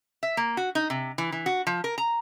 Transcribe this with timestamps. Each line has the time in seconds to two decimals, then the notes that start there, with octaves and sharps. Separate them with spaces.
0.23 E5
0.37 A#3
0.57 F#4
0.75 D#4
0.90 C3
1.18 E3
1.32 E3
1.46 F#4
1.67 F3
1.84 A#4
1.98 A#5